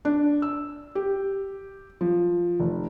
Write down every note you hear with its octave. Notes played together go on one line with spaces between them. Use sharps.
D4
E6
G4
F3
F1